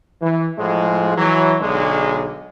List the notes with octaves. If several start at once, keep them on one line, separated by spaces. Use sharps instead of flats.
E3
A2 F3 G#3
E3 F#3
B1 D3 G#3